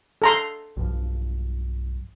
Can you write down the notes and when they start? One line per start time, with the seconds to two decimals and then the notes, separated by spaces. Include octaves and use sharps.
0.22 A4 A#5 C6
0.77 B1 G2 F3